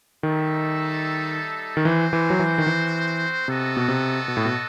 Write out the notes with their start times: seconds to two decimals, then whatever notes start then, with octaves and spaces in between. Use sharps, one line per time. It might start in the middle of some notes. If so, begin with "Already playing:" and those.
0.23 D#3 G3 D#4 A4 E5
1.77 D#3
1.85 E3 C4 F#4 C5
2.13 E3
2.30 F#3
2.39 E3
2.58 D#3
2.67 E3
3.47 C3 B3 F#4 A4 D#5
3.77 B2
3.88 C3
4.28 B2
4.37 A2
4.45 B2